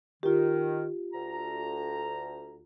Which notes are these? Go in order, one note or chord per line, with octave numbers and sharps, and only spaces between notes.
D#3 F4 G4
D2 A#5